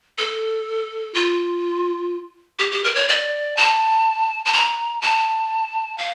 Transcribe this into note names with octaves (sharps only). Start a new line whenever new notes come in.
A4
F4
G4
G4
A#4
C#5
D5
A5
A5
A#5
A5
F5